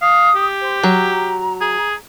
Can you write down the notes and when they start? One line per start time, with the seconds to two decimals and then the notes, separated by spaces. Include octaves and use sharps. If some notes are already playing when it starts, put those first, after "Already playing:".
0.02 F5 D#6
0.36 G4
0.61 C5
0.83 F#3 A#5
1.61 G#4